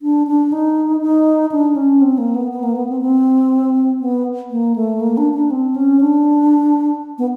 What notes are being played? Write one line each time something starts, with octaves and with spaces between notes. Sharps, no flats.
D4
D4
D#4
D#4
D4
C#4
C4
A#3
B3
B3
A#3
B3
C4
C4
B3
A#3
A3
A#3
D4
D4
C4
C#4
D4
B3